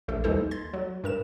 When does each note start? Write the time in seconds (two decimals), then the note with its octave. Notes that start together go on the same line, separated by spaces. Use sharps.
0.08 A#1 A3 A4
0.24 D#2 E3 G3 D#4 A4 C5
0.51 C6 G#6 A6
0.74 F#3
1.04 G2 A#4 E7